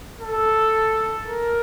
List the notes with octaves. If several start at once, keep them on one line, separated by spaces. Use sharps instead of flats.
A4
A#4